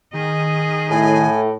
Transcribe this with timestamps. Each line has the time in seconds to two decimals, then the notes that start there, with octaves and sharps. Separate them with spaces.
0.14 D#3 G#4 D#5
0.90 A2 G#5